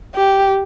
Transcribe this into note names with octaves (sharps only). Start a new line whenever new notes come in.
G4